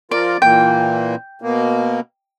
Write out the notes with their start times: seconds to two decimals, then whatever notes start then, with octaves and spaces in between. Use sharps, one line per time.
0.11 F3 F4 A#4 D5
0.42 A#2 E3 A#3 G5
1.42 B2 A#3